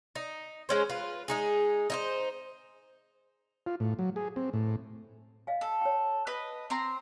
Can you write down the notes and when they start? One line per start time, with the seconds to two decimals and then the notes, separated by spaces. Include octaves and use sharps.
0.15 D#4
0.69 G#3 C#4 C5
0.89 F4 B4
1.28 G#3 D#4 G#4
1.90 D#4 E4 C5
3.66 F4
3.80 A2
3.99 F#3
4.16 G#4
4.36 C4
4.53 A2
5.47 D#5 F5 G#5
5.61 A4
5.81 C#5 G5
6.27 B4 D#5
6.70 C4 A#5 C6